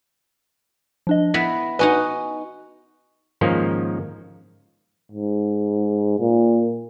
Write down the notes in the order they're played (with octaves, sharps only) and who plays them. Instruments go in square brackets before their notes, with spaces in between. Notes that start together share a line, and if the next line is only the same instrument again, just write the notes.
[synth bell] F3 D4 D#5
[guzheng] B3 E4 B4 [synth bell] A#6
[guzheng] D#4 F#4 D#5 [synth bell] B4 G#5
[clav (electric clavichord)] G#2 D#3 F3 A#3 C#4
[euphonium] G#2
A#2